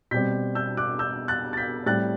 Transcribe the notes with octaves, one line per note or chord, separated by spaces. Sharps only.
B2 G3 C4 G6 B6
E6 G6
D6 F#6
E6 G6
F#6 A6
A6
G6 B6
A2 G3 C4 F#6 A6